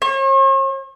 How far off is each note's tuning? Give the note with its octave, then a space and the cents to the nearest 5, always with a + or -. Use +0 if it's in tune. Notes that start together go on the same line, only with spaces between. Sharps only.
C#5 -45